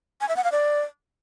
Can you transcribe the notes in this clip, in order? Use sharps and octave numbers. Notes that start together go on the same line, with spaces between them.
G#5
E5
F#5
F5
D5